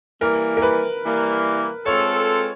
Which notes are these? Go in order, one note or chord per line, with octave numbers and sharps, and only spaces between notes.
E3 G3 A#3 A#4
A#4
B4
E3 G3 A#3
G#3 C4 F4 A4 C#5